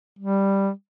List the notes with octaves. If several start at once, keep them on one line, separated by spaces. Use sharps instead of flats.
G3